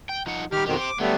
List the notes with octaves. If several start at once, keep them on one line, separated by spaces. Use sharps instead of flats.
G5
F3 D#4 F#5
D#3 G3 G4 F6
F2 B2 D#3 G4 C5
D6
D3 F#3 G3 A3 B3